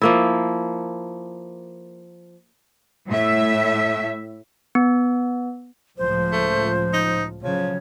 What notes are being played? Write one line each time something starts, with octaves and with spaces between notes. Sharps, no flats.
F3 A#3 E4
A2 E5
B3
C#2 A2 F3 C5
A3
D#4
C#3 F3 F#3 C#5